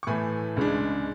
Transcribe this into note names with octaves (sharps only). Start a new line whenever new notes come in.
C#6
A2 E3 A3 G#5 B5
C#2 C#3 G#3 D4